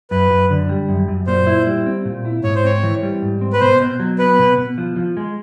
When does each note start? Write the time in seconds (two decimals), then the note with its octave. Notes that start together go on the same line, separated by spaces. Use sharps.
0.11 F#2 B4
0.31 F#2
0.50 D3
0.69 G3
0.89 F#2
1.08 F#2
1.27 A#2 C5
1.47 E4
1.67 G3
1.86 C4
2.05 A#2
2.25 E4
2.44 G#2 C#5
2.55 C5
2.64 C4 C#5
2.83 E3
3.03 G3
3.22 G#2
3.41 C4
3.53 B4
3.61 B2 C5
3.80 B2
4.00 F#3
4.19 B3 B4
4.39 B2
4.58 B2
4.78 F3
4.96 F3
5.17 G#3